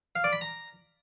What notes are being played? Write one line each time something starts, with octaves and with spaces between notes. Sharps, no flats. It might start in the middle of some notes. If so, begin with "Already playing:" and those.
F5
D5
B5
A#5